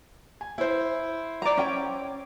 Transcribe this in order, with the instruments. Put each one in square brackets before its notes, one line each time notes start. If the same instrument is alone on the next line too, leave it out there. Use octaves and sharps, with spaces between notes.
[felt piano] G#5
E4 C5
[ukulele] D5 A#5
C#4 G5